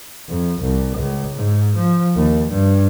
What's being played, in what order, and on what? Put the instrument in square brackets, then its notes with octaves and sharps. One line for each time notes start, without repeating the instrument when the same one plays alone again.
[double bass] F2
C2
C#2
G#2
F3
D#2
G2